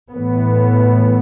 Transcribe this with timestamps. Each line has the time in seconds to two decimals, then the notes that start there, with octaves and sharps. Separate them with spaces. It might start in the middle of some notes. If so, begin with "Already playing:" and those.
0.12 A2 E3 B3